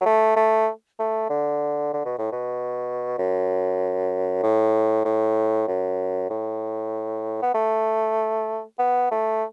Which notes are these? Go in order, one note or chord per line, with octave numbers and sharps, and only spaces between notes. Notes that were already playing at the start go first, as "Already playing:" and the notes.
F#3
A3
A3
A3
D3
D3
B2
A2
B2
F#2
A2
A2
F#2
A2
B3
A3
B3
A3